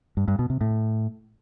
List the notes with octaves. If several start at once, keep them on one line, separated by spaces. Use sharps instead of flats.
G2
G2
B2
C3
A2